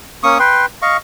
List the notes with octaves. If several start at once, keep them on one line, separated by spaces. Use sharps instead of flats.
A#3 C#4 C#6 D#6
B4 G5 C6
D#5 F5 C#6